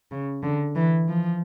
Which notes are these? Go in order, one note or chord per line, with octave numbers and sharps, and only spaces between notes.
C#3
D3
E3
F3